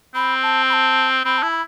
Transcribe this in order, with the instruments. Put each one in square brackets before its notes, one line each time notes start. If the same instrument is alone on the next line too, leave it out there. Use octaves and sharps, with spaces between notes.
[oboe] C4 [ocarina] B5
[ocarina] A5
B5
A5
[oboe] C4 [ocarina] B5
[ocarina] A5
[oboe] E4
[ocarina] B5